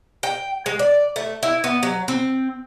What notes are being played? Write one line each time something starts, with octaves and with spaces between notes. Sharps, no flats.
G5
G#3
D5
A3
E4
B3
F#3
C4